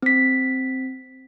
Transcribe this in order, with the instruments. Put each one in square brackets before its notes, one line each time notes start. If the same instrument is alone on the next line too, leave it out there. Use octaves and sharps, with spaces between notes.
[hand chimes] C4 B6